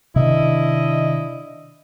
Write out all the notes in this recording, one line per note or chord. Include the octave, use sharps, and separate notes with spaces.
C3 D#3 D4 E4 D#5